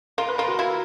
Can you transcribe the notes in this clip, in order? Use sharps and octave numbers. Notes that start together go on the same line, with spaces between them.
F4 A#4
B4
F4 A#4
F#4
E4 F4